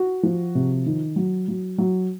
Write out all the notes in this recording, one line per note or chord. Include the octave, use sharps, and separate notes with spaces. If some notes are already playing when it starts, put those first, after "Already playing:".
Already playing: F#4
F3
C3
D#3
F#3
F#3
F#3